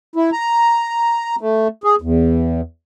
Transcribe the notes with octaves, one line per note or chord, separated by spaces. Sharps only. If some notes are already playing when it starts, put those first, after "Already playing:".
E4
A#5
A3
G#4
E2